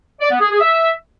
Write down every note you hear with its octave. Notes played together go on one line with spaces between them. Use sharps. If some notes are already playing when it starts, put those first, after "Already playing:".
D5
B3
G#4
G#4
E5